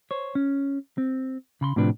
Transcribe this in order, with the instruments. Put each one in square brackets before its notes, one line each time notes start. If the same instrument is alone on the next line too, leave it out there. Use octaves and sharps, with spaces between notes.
[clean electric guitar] C5 C#5
C#4
C4
C#3 B5 C6
A2 C3 F3 D4 B4